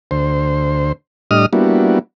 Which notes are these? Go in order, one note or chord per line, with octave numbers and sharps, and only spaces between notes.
D2 C5
A2 G3 D4 D#5 D#6 F6
G3 A#3 B3 D4 E4 F#4